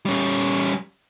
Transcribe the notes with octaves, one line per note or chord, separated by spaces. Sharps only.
G3 C#4